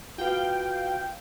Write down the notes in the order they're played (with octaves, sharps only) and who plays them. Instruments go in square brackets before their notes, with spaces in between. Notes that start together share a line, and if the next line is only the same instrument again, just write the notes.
[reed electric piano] F4 F#4 B4 [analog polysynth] F5 G5